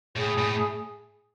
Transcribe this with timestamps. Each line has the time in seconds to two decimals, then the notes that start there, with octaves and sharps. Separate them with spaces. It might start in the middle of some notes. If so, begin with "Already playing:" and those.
0.16 A2 G#4
0.38 A2